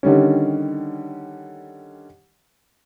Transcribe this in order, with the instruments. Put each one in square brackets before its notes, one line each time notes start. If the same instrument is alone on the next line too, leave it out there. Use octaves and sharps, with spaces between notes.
[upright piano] D3 D#3 G3 C#4